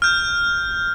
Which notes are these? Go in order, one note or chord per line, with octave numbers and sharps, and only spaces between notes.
F6 G6